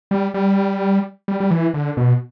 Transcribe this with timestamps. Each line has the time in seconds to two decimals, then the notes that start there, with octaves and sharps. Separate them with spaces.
0.11 G3
0.34 G3
1.28 G3
1.40 G3
1.51 E3
1.74 D3
1.97 B2